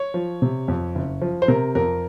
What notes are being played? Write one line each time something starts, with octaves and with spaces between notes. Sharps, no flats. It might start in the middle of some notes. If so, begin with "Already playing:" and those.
Already playing: C#5
F3
C3
F2
F#1
F3
C5
C3 A#4
F2 A#4